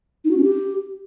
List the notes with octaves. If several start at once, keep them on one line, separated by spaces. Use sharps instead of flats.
D#4
F#4
C#4
G4